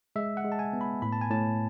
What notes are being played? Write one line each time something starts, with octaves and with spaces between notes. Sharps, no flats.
G#3 E5
F#5
G#3
A5
G#5
B3
B5
A2 B5
A5
G#5
A2 A5